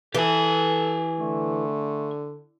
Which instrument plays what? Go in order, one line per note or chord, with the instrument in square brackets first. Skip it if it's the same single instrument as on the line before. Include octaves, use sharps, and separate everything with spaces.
[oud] E3 [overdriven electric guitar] G4 G#5 [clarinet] A4
[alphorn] D3 [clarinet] A3